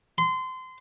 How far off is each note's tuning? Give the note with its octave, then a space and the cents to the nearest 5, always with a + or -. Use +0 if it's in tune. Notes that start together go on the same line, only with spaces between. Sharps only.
C6 -25